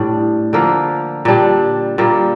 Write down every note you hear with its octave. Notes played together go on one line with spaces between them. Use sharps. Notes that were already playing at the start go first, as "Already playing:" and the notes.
Already playing: A2 G3 D4
D3 F3 A#3
A#2 G3 D4 G4
A#2 G3 A#3